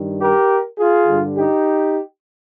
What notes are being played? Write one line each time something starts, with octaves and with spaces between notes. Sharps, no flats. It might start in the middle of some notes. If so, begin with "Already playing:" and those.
Already playing: G2 D#3 G3
G4 A#4
F4 G#4
G2 D3 G3
D#4 G4